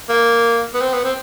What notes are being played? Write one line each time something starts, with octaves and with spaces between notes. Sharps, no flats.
A#3
B3
C4
B3
C4